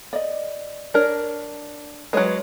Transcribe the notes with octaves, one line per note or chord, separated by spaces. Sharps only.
D5 D#5
D4 A#4 C#5
F#3 G#3 B4 C#5